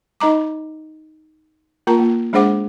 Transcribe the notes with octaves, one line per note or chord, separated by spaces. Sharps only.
D#4 D#5 A#5 D6
A#3 F4 A#4 A5 A#5
A#3 F4
G#3 D4 G#4 C5 F#5 D6